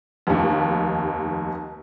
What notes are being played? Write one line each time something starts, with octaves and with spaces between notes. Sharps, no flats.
F1 D#2